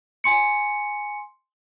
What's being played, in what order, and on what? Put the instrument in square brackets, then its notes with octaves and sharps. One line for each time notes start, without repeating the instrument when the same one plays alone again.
[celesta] G#5 C6 C#7